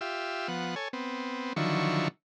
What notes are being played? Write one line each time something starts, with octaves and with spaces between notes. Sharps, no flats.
F4 G4 E5
F3 B3 F#5
A4 C#5 G#5
B3 C4
D3 D#3 F3 F#3 E4 C#6